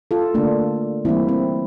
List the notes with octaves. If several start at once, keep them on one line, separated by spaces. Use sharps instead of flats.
F4 A4
D3 A3 A#3 D4
E3 G3 A#3 C4 E4
C4